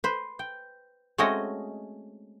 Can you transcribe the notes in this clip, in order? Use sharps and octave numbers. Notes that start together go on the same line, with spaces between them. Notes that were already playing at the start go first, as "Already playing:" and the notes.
B4 C5
G5
G#3 A3 C4 C#4 F#4 D#5